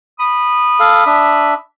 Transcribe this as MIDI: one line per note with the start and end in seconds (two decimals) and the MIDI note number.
0.20 1.57 83
0.20 1.57 87
0.80 1.04 69
0.80 1.04 77
1.06 1.54 62
1.06 1.54 76